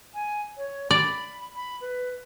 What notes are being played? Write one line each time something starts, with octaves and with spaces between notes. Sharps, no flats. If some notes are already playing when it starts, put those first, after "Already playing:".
G#5
C#5
D5 B5
B5
B4